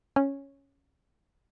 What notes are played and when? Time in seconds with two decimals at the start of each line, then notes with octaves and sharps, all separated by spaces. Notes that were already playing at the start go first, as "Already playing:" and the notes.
0.16 C#4